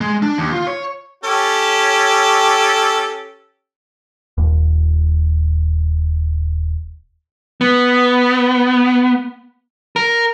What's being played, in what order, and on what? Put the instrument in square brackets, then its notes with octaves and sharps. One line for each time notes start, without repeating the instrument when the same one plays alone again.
[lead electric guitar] G#3
D4
D#2
F4
C#5
[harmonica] C#4 G4 A4
[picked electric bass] D#1 D#2
[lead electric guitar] B3
A#4